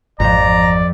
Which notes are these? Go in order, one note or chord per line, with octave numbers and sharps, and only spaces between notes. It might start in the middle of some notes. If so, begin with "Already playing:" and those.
G#1 F2 F3 D5 A#5